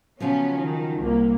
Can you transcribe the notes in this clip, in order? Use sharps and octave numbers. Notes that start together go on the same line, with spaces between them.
C#3 F3 F#3 B3 C#4
D#3
C2 A#3